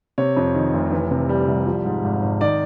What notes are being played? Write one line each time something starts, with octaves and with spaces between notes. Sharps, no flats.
C3 C#5
F2
D#3
F1
E3
C3
G3
C2
F3
G#2
G#1
G#1
D#3 D5